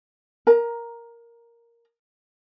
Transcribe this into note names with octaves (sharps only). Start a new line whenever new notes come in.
A#4 A#5